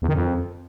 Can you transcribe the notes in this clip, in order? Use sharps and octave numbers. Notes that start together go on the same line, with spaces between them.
E2
D#3
F2